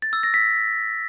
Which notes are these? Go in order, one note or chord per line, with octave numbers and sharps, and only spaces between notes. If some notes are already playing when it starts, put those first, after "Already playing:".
A6
E6
A#6
B6